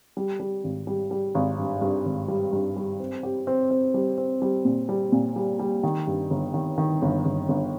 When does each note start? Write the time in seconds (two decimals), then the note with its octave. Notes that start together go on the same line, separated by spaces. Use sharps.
0.17 G3
0.40 G3
0.64 G#1
0.87 G3
1.11 G3
1.35 G#1
1.58 G2
1.81 G2
2.05 G#1
2.28 G3
2.53 G2
2.76 G3
3.00 C4
3.23 G4
3.47 C4
3.71 C4
3.94 G3
4.18 C4
4.42 G3
4.65 A#2
4.89 G3
5.12 A#2
5.36 G3
5.59 G3
5.83 D#3
6.07 G2
6.30 G1
6.54 D#3
6.78 D#3
7.02 G1
7.25 G1
7.48 G1